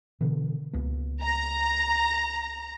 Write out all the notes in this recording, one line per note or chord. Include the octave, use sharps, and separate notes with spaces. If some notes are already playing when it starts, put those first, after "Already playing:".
B2 D3 E3
C#2 A#3 B3
A#5